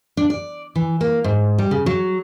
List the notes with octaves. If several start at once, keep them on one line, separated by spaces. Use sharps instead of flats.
D4
D5
E3
A#3
G#2
G3
C#3
F#3